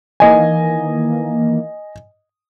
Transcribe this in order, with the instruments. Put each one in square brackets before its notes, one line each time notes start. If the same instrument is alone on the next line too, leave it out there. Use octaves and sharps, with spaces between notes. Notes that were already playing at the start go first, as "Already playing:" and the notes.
[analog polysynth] D#3 E3 A#3 [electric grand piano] D#5 G#5